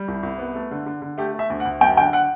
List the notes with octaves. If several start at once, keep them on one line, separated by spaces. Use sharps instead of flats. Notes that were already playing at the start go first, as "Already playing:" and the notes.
Already playing: G3
C2
C2
B3
A3
D3
D3
D3
A3 G4
A3
E5
D2
F#5
D2
F#2 G5
D3 G5
F#5